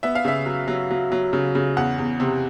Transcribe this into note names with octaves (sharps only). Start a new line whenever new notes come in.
B3 E5
F5
C#3 E5
F#3
F#3
F#3
F#3
C#3
C#3
E2 F#5
E2
C3